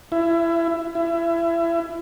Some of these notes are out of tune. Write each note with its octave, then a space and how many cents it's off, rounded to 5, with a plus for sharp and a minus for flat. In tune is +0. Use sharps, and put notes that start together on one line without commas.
E4 +25
E4 +30